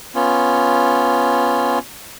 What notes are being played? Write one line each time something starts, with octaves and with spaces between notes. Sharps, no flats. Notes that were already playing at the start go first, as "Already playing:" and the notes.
B3 C#4 F4